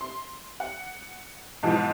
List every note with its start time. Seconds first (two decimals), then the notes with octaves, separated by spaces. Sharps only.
0.01 C6
0.60 F#5
1.63 B1 G#2 B2 E3 F3